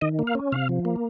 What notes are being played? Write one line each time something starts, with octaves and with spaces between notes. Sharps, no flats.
D#3 D#5
A#3
F5
C#4
C3 F5
F3
A#3